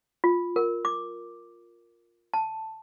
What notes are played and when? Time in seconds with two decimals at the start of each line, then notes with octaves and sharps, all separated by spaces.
0.24 F4
0.56 A#4
0.85 D6
2.34 A5